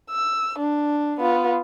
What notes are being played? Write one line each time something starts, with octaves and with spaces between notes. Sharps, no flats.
E6
D4
B3 F4